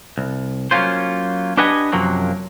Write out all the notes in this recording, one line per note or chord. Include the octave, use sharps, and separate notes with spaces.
C2
F#3 A#3 C#4 F4 C5
D4 G4 B4 D#5 F#5 G#5
F#2 C3 F3 F#3 A#3